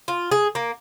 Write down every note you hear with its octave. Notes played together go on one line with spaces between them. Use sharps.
F4
G#4
A#3